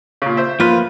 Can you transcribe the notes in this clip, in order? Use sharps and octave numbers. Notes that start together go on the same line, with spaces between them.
A#2 C#3
C5 E5
F3 A#3 F4 B4